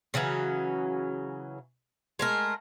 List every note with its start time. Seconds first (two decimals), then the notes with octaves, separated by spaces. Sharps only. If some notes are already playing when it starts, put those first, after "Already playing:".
0.14 C#3 E3 F#3 C#4
2.19 G#3 A3 A#4